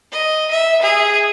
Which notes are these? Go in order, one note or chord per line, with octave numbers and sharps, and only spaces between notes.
D#5
E5
G#4